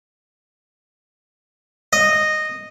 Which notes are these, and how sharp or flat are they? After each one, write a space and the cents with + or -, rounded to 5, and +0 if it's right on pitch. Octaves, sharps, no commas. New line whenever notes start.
D#5 -10